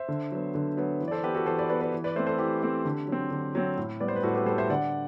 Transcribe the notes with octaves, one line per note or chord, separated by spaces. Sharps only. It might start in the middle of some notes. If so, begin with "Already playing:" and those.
Already playing: C5 E5
D3
F#3 B3
D3
F#3 B3
E3
D5
A4 C5
B3 G4 B4
F#4 A4
E3 A4 C5
B4 D5
B3 B4 D5
B4 D5
E3
B4 D5
A3 C4 C5 E5
A4 C5
E3 G4
A3 C4
D3
F#3 C4
D3
F#3 C4
A2
G3 B3 D5
C5
B4
A2 F#4 A4
G4 B4
G3 B3 A4 C5
C5 E5
D3 D5 F#5